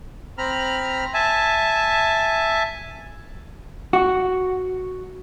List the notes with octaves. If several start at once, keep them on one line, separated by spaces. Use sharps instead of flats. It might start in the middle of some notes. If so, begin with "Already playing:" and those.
C4 A#5 B5 F6
E5 G#5 A5
F#4